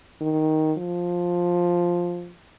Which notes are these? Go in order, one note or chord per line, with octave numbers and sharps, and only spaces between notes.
D#3
F3